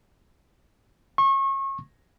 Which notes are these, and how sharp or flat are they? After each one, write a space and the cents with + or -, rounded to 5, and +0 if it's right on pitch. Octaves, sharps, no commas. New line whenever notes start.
C#6 -30